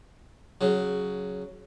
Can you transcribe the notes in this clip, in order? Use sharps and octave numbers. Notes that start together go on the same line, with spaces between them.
C#3 F#3